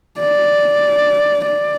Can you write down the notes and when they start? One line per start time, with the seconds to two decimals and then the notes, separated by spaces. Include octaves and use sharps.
0.20 D5
1.46 D5